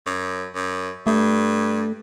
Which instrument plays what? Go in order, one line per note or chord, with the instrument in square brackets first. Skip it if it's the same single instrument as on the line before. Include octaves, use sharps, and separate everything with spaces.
[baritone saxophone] F#2
F#2
[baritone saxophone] G2 [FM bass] A3